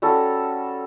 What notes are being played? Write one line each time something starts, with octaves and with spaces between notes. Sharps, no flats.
G3 C#4 F#4 A4